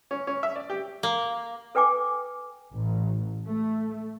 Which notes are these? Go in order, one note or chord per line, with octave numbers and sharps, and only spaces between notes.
C#4
C#4
E5
D5
G4
A#3
A4 B4 G5 G#5 D6
A1
A3